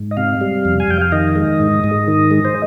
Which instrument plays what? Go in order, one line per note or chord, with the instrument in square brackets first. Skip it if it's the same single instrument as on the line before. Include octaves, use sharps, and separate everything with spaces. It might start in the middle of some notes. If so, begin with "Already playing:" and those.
Already playing: [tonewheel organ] G#2
D#5
C3 F5
G3
F2
G#5
F2 G5
F5
D#3 D#5
G#3
G#2
G#2
D#3
G#3
C5